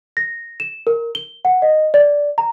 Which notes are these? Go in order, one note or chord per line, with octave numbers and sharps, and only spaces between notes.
A#6
E7
A#4
G7
F#5
D#5
D5
A#5